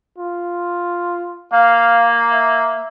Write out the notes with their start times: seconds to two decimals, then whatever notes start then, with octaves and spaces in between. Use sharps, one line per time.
0.19 F4
1.53 A#3 F5
2.33 E5